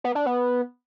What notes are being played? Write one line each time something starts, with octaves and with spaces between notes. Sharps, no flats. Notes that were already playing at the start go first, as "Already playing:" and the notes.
B3
D4
B3